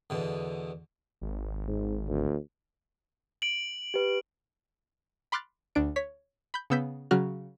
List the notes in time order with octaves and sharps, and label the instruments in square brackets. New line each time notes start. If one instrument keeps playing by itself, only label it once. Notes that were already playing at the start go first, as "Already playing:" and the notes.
[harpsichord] E2 B2 D3
[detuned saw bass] G#1
[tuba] G#2
D2
[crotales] D7 F#7
[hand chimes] G4 B4
[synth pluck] B5 C6 D6 F6 F#6 A6
D2 D4 D7
C#5 B6
B5 G6
C#3 B3 E6 G6 B6
C#3 F#3 F#4 F6 F#6